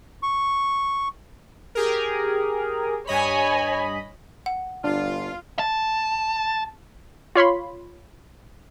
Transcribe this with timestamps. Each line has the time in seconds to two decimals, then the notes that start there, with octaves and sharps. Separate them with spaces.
0.23 C#6
1.75 G4 G#4 A#4
3.07 G2 C#5 D#5 G#5 B5
4.46 F#5
4.84 G1 D4 F4
5.59 A5
7.35 F4 C#5 B5 C6